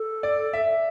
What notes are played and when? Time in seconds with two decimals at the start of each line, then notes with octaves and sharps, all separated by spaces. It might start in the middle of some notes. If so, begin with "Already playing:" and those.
Already playing: A4
0.23 D5
0.53 E5